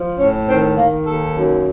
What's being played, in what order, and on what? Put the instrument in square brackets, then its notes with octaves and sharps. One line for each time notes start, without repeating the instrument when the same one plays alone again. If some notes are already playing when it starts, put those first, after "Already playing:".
Already playing: [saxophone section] F3
A2 C#4
D#3 C4
D#3 A#3
D#2 A4
F#2